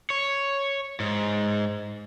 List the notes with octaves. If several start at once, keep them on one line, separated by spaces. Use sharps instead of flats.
C#5
G#2